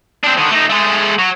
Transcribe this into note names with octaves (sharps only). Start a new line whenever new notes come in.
C4 D4
D3 D#3
A3 D#4
G#3 A3
F#3